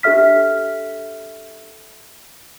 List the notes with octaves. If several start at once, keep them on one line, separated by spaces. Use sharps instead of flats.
D4 G4 A4 E5 F6 B6